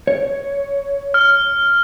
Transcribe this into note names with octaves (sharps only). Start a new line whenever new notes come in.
C#5
F6